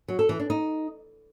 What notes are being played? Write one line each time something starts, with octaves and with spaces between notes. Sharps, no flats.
F#3
A4
E3
D4
D#4